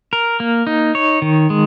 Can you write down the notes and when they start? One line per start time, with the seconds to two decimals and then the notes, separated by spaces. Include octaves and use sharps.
0.13 A#4
0.40 A#3
0.67 D#4
0.95 C#5
1.22 D#3
1.50 G#3